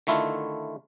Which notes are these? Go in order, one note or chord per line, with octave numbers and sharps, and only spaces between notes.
D3 D#3 A3 E4 F4